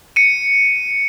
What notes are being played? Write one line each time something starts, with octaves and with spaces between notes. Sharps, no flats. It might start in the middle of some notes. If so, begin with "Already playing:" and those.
C#7 D#7